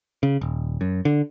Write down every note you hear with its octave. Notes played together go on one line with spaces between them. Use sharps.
C#3
D#1
F#2
D3